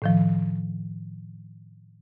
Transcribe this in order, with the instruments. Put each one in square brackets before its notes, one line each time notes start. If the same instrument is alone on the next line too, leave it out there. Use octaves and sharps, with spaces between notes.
[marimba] A2 D#3 F3